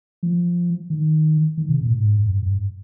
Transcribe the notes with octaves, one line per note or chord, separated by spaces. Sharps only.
F3
D#3
D#3
C3
A#2
G#2
G2
G2